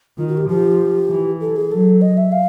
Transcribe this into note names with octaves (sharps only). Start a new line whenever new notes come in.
D#3 F4
F#4
G4
F3 G4
E3
A4
G#4
F#3 A4
D#5
E5
F5